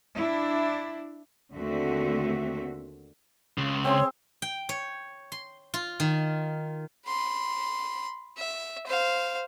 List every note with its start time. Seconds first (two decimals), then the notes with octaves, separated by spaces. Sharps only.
0.15 D4 E4
1.54 D#2 D3 A3 C4 F#4 E5
3.58 C#2 C#3
3.85 C4 G#4 C#5 C6
4.42 G5
4.69 C#5
5.32 C6
5.74 F4
6.00 D#3
7.06 B5 C6
8.37 E5
8.86 C5 F5